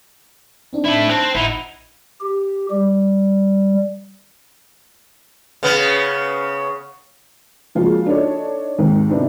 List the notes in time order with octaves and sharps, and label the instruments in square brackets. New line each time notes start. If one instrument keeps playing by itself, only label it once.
[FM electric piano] C4 D4 D#4
[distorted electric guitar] E4 A4
[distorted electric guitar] C4 [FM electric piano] A5 F#6 G#6
[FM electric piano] A1 F#5 [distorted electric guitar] D#4 E4
[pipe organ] G4
G3
[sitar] C#3 B3
[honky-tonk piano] C#3 F3 G#3 A#3 F4 F#4
D4 D#4 A4 C#5 D#5
D#2 G#2 D#3 C4
C3 B3 C4 D4 D#4